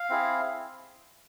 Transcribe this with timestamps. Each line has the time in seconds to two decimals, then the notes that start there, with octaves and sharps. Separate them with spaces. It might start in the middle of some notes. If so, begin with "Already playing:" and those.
Already playing: F5
0.10 C4 E4 G#4